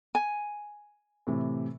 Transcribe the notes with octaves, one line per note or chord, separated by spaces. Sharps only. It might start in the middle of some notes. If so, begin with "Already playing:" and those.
G#5
A2 C3 E3